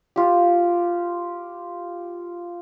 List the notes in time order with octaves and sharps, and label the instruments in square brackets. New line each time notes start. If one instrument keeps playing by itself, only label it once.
[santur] F4 G4